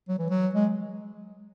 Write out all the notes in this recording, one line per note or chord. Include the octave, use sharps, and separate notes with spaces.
F#3
E3
F#3
G#3